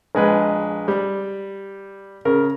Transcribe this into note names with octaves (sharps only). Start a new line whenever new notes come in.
A#1 G#3 B4
G3
C#3 A#4